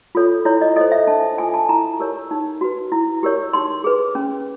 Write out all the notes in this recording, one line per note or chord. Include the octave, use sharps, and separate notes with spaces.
F4 A4 C#5
E4 C#5
D#5
A4 C5 D#5
E5
D4 A5
F4 A4 G#5
A5
E4 A#5
G4 A#4 C#5
D#4
F#4 B4
E4
G4 A#4 C#5
D#4 C6
G#4 B4
C#4